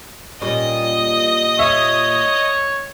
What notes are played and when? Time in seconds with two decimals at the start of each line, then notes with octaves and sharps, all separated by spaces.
0.42 A#2 G3 C#4 D#5
1.59 C#5 E5